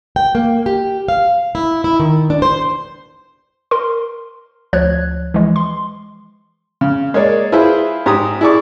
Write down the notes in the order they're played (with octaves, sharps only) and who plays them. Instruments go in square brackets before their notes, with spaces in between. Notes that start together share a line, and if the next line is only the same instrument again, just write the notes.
[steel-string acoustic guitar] G5
A#3
G4
F5
E4
E4
D#3
D4
C5
[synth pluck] A#4 C6
D2 F3 C#5 F#6 G#6
E3 F3 G#3
C6
[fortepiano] C#3
G#3 A#3 C#5 D5
E4 F4 G#4 B4 C5 E5
G#2 G4 A#5 D#6
E4 G#4 D5 E5 C#6 D6